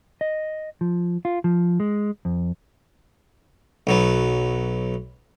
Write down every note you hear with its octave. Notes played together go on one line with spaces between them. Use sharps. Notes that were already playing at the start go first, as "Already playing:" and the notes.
D#5
F3
F4
F3
G#3
F2
B1 F#3 B3